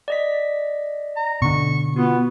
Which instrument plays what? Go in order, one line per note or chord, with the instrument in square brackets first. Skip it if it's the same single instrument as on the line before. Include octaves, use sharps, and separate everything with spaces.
[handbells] D5 D#5 B6
[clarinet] A#5
[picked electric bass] B2 D3 [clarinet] C#6
[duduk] B3 [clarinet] F4 [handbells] F#4